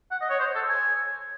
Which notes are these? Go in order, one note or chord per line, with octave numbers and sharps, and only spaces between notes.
F#5
D#5
C#5
C5
A4
G#5